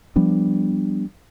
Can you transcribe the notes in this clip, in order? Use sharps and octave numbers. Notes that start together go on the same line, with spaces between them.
F3 G3 B3 D4